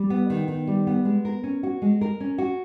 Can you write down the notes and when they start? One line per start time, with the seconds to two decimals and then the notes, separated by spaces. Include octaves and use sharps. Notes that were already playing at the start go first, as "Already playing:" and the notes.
Already playing: G3
0.10 B3
0.30 D#3
0.48 D#3
0.67 G3
0.87 B3
1.05 G#3
1.25 A#4
1.44 C#4
1.63 F#4
1.82 G#3
2.01 A#4
2.20 C#4
2.38 F#4